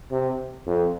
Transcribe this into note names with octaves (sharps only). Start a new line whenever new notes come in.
C3
F2